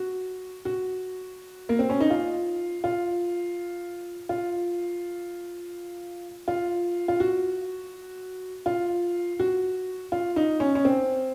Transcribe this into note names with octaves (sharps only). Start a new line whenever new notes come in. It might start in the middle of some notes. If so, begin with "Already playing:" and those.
Already playing: F#4
F#4
A#3
C4
C#4
D#4
F4
F4
F4
F4
F4
F#4
F4
F#4
F4
D#4
C#4
C#4
C4